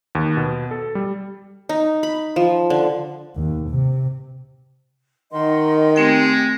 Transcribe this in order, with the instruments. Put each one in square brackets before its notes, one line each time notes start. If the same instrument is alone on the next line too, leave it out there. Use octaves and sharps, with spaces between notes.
[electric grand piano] D#2
B2
A4
G3
[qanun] D#4
B5
F3
D3
[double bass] D#2
C3
[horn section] D#3 [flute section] D#5 F#5 C6
[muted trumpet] G#3 [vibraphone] A3 C4 G5 [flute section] G4